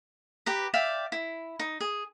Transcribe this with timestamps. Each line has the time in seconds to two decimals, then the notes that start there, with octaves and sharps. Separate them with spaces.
0.46 G4 B4 A#5
0.74 D5 E5 F5 G5
1.12 E4
1.59 D#4
1.81 G#4